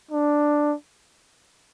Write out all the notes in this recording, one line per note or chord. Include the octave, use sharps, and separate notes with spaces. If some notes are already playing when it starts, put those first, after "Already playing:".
D4